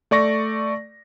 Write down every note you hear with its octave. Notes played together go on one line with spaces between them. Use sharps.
A3 D5 C#6 A#6